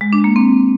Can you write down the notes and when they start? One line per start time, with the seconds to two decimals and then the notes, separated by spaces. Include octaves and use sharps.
0.01 G#3
0.13 D4
0.24 A#3
0.36 C4